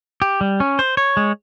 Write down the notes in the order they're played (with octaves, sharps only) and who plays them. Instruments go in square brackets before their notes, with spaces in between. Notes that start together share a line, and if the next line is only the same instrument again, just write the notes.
[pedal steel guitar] G4
G3
C#4
C5
C#5
G#3